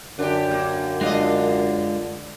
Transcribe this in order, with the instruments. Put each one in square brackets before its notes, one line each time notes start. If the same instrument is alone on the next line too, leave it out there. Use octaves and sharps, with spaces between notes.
[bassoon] F#2 [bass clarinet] D3 [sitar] D4 G4
[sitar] A#3
[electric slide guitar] G#3 F4 [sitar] D4 D#5